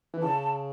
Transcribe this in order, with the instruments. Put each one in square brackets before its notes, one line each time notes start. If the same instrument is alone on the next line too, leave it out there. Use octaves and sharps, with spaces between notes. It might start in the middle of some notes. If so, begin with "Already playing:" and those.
[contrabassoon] E3
[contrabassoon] C#3 [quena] A5